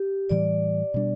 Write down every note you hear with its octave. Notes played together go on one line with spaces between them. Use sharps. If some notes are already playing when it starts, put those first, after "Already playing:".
Already playing: G4
A2 E3 G3 D5
B2 G3 D4